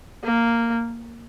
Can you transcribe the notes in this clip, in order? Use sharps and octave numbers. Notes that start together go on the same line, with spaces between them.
A#3